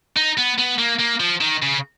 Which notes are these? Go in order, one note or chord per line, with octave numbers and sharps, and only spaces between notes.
D#4
B3
B3
A#3
A#3
F3
D#3
C#3